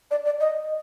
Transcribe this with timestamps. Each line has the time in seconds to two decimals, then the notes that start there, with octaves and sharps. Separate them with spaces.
0.11 D5
0.25 D5
0.40 D#5